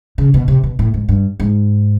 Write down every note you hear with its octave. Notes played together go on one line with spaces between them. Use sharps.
C#3
B2
C3
B2
A2
G#2
G2
G#2